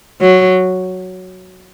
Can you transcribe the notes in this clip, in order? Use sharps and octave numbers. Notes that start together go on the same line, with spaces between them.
F#3